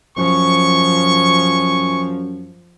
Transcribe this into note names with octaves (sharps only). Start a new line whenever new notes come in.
F#2 F3 G#5 C#6